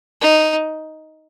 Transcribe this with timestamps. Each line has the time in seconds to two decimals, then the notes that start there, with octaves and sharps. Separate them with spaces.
0.21 D#4